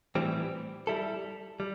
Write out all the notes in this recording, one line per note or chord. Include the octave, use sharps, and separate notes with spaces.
A2 E3 G3 C4
G3 E4 A4
G3